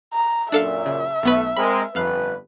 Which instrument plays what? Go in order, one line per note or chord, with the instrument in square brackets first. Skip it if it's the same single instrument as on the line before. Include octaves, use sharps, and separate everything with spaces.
[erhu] A#5
[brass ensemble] F#2 A#2 [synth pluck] D4 A4 F5 [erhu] E5
[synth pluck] C#3
[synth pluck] B1 B3 B4 [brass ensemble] A3
[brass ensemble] G#3 C4 A#4 [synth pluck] B5
[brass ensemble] G1 B4 [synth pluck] F2 F5 F#6